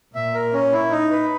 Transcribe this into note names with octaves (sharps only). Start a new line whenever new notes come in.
A#2 E5
A#4
C#4
E4
D#4
B4